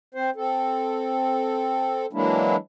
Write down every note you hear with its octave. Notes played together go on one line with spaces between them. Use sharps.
C4 C5
C4 A4
E3 F#3 G#3 A#3 D4 E4